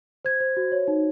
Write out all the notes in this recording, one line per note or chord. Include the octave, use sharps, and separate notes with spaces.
C5 G#6
C5
F#4
C#5
D#4